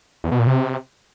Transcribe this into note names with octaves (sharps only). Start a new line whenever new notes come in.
E2
B2
A#2
C3